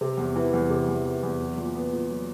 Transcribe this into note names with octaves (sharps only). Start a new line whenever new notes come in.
C3
E2
E3
E2
C3
E2
E3
E2
F#3
A#2
B3
A#2
F#3